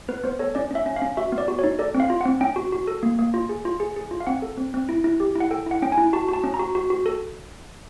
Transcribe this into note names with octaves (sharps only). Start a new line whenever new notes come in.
B3 B4
B3 C5
A4 C#5
C#4 D5
C#4 E5
C#4
F5
C#4
F#4 E5
B3
D5
F#4
C#5
D#4
A4 D5
C4
F5
F4
F#5
C4
C#4 G5
F#4
F#4
A4
A#3
A#3
F4
G#4
F4
G#4
G#4
F4
F5
C4 F#5
A4
C4
C4
E4
E4
G4
E4
F#5
A4 G5
E4 F#5
C#4 G5
G#5
E4
F#4 A5
F#4 A5
C#4
A#5
F#4
F#4
F#4
A4